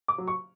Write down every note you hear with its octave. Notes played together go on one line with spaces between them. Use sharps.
D6
F#3
C#6